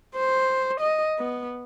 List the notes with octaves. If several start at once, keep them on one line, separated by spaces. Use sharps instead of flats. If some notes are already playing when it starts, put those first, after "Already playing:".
C5
D#5
B3